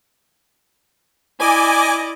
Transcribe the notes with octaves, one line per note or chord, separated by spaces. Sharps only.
E4 D5 D#5 G#5 D6